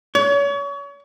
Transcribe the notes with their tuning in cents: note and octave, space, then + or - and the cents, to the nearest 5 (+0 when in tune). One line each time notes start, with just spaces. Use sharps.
C#5 +35